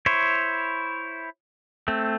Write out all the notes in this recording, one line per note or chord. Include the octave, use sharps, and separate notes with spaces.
E4 C5 C#5
A3 C4